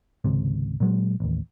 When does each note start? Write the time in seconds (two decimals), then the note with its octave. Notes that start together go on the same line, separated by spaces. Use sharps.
0.24 G#1 C#2 C3
0.80 A#2 F#3 G#3
1.20 A1 D#2